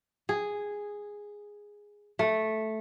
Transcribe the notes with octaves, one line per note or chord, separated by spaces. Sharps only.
G#4
A3